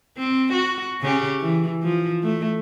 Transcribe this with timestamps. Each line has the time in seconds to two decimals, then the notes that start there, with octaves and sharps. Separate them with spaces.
0.17 C4
0.53 F#4
1.01 C#3 C#4 G4
1.41 E3
1.83 F3
2.23 A3